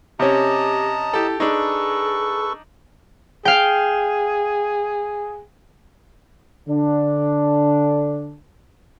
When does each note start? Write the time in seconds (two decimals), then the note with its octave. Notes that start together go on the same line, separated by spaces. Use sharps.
0.20 C3 C#4 G4 D#5 A5 A#5
1.14 E4 G4 A4
1.40 D4 D#4 G#4 A4 B4 C#6
3.45 G#4 F5 G5
6.69 D3 D4